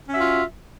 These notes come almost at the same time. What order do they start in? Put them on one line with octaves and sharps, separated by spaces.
C#4 E5 F#4 F4